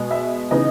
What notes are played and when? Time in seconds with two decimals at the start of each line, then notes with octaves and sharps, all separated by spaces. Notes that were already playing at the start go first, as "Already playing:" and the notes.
Already playing: B2 G#3
0.11 E5
0.51 C#3 E3 B3 D#4 D#5